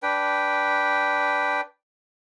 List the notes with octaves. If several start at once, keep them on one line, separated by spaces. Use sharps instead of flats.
D4 B4 G5